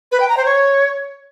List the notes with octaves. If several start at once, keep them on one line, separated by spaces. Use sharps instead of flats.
B4
G5
A#5
C5
C#5